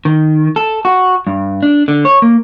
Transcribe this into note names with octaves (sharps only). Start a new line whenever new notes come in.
D#3
A4
F#4
G2
D4
D3
C#5
A#3